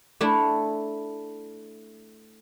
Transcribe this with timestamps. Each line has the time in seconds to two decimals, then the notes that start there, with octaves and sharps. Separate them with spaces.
0.21 A3 D4 E4 A4